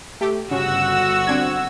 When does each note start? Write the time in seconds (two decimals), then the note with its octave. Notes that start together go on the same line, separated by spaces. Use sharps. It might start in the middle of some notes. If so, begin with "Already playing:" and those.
0.21 A3 G4
0.51 G1 C#3 F#4 E6
1.27 C4 D4 G#6